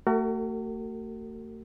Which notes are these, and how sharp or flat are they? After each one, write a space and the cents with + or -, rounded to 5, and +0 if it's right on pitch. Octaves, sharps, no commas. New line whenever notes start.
A3 +35 F#4 +35 A#4 -40